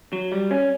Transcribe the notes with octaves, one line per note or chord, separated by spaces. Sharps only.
F#3
G3
C#4